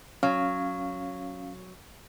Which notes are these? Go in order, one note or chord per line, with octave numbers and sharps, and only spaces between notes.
F#3 C#4 F5